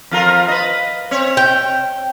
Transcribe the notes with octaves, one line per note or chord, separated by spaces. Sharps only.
F2 F4 A#4
B4 D#5
C4 C#5
G5